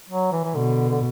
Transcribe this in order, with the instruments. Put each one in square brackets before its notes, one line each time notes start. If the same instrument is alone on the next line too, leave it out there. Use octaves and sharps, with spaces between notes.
[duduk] F#3
E3
E3
[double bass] B2 [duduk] D3
[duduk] D3